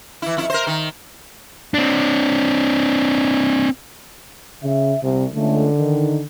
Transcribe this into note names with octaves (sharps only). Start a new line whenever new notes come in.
E3 E4
F2 E4
A#4 C5
D#3
C4 D4
C#3 E5
C2 C3
C#2 D3 A3
D#3